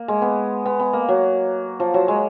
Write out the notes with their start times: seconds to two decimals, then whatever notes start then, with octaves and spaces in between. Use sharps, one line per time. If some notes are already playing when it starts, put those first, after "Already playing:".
Already playing: A#3
0.08 G#3
0.22 B3
0.66 B3
0.80 B3
0.93 A#3
1.09 F#3
1.80 F3
1.94 F#3
2.08 G#3